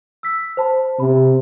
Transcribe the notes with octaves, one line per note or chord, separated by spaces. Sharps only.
E6 B6
C5 A5 B5
C3 B5